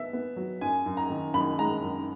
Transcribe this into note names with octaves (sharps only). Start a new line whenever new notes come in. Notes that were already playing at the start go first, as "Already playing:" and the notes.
Already playing: B3 E5
B3
F#3
F#2 G#5
F#2
A#5
D#3
F#2 B5
G#3 A#5
F#2